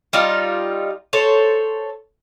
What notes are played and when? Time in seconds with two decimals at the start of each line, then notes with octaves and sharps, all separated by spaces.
0.13 G3 D#4 F4
1.13 A4 C5 C#5